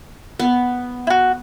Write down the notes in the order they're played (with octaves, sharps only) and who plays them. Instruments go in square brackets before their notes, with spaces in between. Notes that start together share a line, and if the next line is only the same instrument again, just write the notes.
[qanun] B3
[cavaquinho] E4 F#4